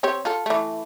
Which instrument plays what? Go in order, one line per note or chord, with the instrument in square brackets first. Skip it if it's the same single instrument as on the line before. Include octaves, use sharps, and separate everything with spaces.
[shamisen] C4 G4 C#5
F4 A4
E3 A3